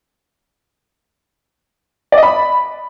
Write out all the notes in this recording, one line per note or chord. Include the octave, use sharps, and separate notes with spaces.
D5
D#5
B5